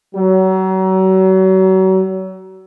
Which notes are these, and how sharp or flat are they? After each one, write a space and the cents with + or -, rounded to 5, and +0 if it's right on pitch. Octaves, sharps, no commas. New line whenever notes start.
F#3 +35